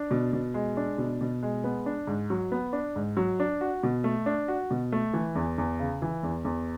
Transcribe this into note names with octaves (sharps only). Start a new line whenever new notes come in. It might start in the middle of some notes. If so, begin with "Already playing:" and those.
Already playing: D4
B2
B2
G#3
D4
B2
B2
G#3
B3
D4
G#2
F#3
B3
D4
G#2
F#3
D4
F#4
B2
A3
D4
F#4
B2
A3
E3
E2
E2
C#3
E3
E2
E2